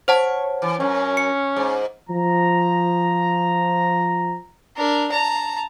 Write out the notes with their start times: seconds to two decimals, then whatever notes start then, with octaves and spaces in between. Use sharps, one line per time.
0.08 C5 C#5 F#5 A5
0.62 E3
0.80 F#2 C#4
1.17 C#7
1.56 G#2
2.10 F3 A#5
4.77 D4 A#4
5.12 A5 A#5